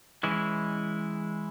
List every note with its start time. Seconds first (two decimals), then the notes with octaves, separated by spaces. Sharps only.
0.23 E3 G#3 C#4 E4